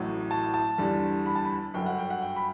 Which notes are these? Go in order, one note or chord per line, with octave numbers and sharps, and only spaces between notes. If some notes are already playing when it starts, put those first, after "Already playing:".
Already playing: A1 A2 F#3
A5
A5
E2 D3 G3
B5
A5
B5
G1 F#2 F#3 G5
F#5
G5
F#5
G5
B5